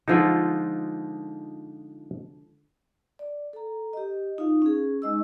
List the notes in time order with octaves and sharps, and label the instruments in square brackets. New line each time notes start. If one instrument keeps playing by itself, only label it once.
[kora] D3 F3 G#3 [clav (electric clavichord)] D#4 F4
[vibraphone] D5
A4 A#5
G4 D#5
D#4 F4 F5
C#4 G#4
G#3 D#4 D#5 C#6 E6